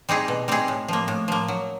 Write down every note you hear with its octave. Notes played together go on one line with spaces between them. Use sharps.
G3 C4 D#4 G#4
B2
G3 C4 D#4 G#4
A2
F3 A#3
A2
F3 A#3
F#3